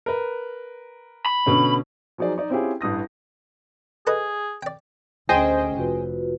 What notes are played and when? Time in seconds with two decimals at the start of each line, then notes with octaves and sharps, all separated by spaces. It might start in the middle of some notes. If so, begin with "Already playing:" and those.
0.06 A#4 B4
1.26 B5
1.46 B2 D3 C#4
2.18 F3 F#3 D#4 G#4 D5
2.38 D#4 D5
2.50 C4 C#4 E4 F4 G4 G#4
2.81 A1 G2 D#6 A#6
4.07 G#4 A4 B4 D#5
4.63 D5 G5
5.29 D2 C#4 G#4 C5 D#5 G5
5.76 F1 F4 F#4 B4